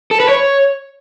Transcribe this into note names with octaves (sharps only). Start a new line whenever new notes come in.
A4
B4
C#5